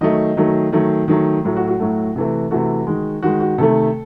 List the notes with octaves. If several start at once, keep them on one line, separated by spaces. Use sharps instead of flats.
D#3 F#3 A3 D#5
D#3 F#3 A3
D#3 F#3 A3
D#3 F#3 A3
A2 F#3 A3
F#4
F#4
A2 F#3 A3
C3 E3 A3
C3 E3 A3 F#4
D#3 G#3
D#3 G#3 F#4
F#4
C3 D#3 A3 A4